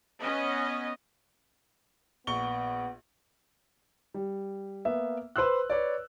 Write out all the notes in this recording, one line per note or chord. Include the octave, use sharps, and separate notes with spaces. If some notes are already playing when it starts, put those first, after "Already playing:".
B3 C#4 D#5
A#1 B3 C#6 G7
G3
A#3 B3 E5
B4 C5 C6 E6 F#6
B4 C#5 D5